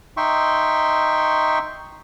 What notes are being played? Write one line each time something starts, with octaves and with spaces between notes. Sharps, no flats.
D#4 E5 G5 C6 C#6